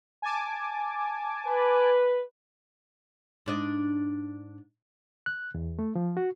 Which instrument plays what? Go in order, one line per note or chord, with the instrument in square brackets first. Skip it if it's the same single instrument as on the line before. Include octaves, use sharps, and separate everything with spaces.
[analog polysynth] G#5 A5 D6
[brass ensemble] B4
[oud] G#2 D4 D#5
[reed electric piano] F#6
E2
A3
F3
F#4